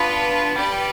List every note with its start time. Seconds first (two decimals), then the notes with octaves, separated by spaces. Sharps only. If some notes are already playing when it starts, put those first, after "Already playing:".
Already playing: B3 D4 F4 B4
0.56 G3 G4 B4 D5
0.73 G3